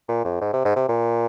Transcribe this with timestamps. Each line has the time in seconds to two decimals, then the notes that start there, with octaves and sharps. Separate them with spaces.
0.09 A#2
0.25 F2
0.41 G#2
0.53 C3
0.65 G#2
0.76 C3
0.89 A#2